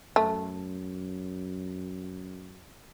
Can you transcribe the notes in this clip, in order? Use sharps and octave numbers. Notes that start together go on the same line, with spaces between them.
F#2 A3